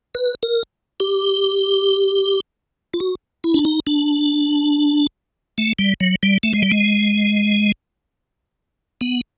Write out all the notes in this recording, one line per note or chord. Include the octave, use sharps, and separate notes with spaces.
B4
A#4
G4
F4
F#4
E4
D4
D#4
D4
A3
G3
F#3
G3
A3
G#3
G3
G#3
B3